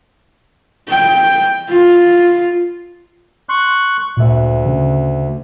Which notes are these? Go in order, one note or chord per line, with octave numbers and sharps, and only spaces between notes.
G5
F4
C6 C#6 F#6
D2 A#2 E5
C#3